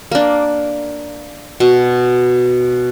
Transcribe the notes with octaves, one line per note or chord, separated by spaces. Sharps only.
A#3 D4
B2